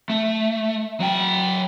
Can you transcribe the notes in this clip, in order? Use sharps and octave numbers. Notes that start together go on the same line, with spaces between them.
A3
F#3 G5